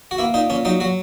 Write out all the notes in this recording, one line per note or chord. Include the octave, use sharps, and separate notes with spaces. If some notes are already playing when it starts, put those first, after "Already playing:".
F#4
A#3 E4
A#2 D#4
A#2 C#4
F#3 D#4
F#3 F#4